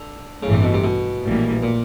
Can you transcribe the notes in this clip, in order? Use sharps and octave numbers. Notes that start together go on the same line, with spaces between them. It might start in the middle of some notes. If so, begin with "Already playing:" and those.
Already playing: D3
A1 G2 C#3 E3 A3
C3
B2
C3
B2
A#1 A2 E3 G3 A#3
A#2